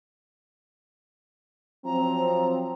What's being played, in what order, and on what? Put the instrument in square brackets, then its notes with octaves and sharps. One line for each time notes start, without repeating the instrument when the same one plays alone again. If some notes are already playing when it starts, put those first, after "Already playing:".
[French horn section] F3 F#3 C4 [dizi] A#5